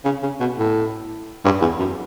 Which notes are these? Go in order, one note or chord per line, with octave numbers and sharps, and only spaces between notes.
C#3
C#3
B2
A2
G2
E2
F#2